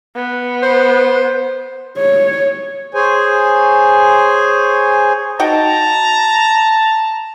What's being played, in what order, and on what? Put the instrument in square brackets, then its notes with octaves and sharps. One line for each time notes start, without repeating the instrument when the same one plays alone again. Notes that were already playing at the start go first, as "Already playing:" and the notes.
[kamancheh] B3
[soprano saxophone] C5
[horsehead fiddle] C#5
[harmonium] G#4 C5 C#5 G#5
[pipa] D#4 F#4 G5 [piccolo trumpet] A5 [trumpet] A#5